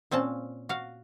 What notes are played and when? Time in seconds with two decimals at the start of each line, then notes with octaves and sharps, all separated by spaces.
0.11 A#2 C4 C#4 A5
0.69 F#4 F5